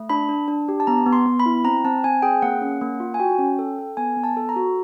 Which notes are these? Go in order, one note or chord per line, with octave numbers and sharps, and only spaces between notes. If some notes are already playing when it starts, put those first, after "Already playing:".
Already playing: A3
D4 B5
D4
D4
G4
A5
B3 A#5
B3
C6
B3
B5
E4
C4 A#5
C4 A5
C4 G#5
G#4 G5
A#3 F#5
C#4
A#3
F4
G#5
F#4 G5
C#4
A4
A4
B3 G#5
B3
A5
A4
A#5
F#4